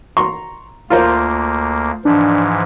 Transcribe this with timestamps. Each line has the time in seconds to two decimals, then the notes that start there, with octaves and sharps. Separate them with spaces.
0.17 A#5 C6 C#6
0.90 D2 A#3 F4 A#4 C5
2.05 G#2 E3 F3 D4